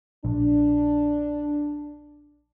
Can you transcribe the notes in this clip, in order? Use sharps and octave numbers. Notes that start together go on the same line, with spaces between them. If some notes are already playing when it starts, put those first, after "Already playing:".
A#1 D4